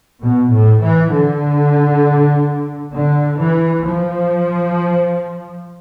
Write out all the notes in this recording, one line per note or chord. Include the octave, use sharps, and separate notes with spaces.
B2
A2
E3
D3
D3
E3
F3